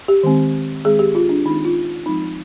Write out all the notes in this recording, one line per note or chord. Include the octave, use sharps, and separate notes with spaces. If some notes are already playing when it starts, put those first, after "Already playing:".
G4
D#3 G#3 C4
D#3 G#3 C4 G#4
G4
F4
D4
D#3 G#3 C4 D#4
F4
F3 G#3 C4 D#4